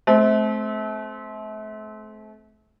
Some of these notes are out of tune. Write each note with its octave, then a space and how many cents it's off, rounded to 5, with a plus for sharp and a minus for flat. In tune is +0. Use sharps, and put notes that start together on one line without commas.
A3 -35 C4 +0